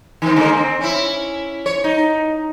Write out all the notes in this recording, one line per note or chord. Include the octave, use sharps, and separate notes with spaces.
D#3 C4
D3 G#3 A#3
C4
C#4 E4
C#5
D#4